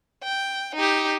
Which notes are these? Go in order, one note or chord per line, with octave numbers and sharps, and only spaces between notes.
G5
D#4 G4